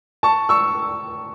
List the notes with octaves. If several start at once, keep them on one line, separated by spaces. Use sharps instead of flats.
A5 C#6
C#6 E6